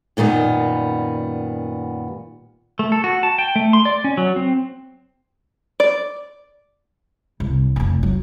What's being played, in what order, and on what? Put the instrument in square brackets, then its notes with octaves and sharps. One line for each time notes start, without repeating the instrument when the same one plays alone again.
[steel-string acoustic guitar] F#2 A#2 D#3 G3 B3
[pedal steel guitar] A3
A4
F#4
A5
G5
A3
C6
D5
C#4
F#3
C4
[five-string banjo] D5
[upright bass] C2
F1 E2
F#3